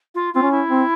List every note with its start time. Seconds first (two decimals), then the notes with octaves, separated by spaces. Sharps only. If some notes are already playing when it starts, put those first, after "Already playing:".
0.15 F4
0.34 C4 F4
0.42 C#4
0.51 E4
0.70 C4